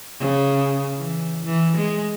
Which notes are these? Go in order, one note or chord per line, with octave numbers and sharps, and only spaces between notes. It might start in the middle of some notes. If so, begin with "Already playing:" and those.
C#3
E3
E3
G#3